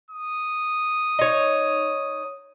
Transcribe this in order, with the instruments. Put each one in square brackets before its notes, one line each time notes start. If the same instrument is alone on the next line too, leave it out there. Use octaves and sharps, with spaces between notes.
[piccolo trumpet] D#6
[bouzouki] D#4 C#5